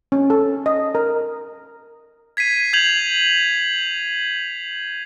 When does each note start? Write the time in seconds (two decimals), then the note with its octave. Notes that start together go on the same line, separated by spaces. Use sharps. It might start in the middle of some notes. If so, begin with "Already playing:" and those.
0.12 C#4
0.30 A4
0.66 D#5
0.95 A#4
2.37 G#6 B6 C7 D#7
2.73 G6 G#6 F7 F#7